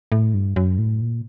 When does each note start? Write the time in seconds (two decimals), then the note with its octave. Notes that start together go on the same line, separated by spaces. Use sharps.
0.12 A2
0.34 G2
0.56 F#2
0.78 A2
1.01 A#2